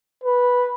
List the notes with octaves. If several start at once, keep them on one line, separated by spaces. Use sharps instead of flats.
B4